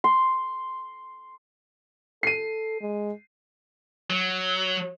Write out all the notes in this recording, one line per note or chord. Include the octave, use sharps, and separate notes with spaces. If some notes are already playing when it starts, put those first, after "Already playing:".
C6
A4 C7 D#7
G#3
F#3